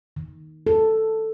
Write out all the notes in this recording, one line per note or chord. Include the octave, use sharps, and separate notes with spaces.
D#3
A4